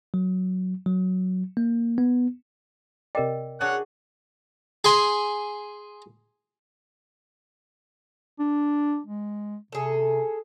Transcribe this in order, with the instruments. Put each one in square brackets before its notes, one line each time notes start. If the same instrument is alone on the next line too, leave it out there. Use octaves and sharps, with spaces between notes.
[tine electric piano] F#3
F#3
A#3
B3
[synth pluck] C3 D5 [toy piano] A#4 D#5 G5
[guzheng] D4 F#4 G#4 [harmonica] C#5 F#5
[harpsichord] G#4 G#5 C6
[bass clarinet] D4
G#3
[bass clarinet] C3 [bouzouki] G#4 A4